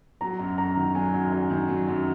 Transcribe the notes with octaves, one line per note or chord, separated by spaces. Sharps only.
F#3 A#5
F#2
F#2 A#5
D#3
F#3 G#5
F#2
F#2 G#5
D#3
F#3
F#2